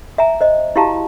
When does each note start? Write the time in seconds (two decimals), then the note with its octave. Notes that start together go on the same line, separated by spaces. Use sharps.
0.18 E5 G#5 A#5
0.41 C5 D#5
0.76 E4 F#4 G4 F5 A5 A#5